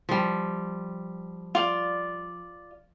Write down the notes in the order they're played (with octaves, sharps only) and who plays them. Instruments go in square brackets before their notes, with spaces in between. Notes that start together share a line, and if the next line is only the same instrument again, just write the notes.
[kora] F3 G3
[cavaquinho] F4 D5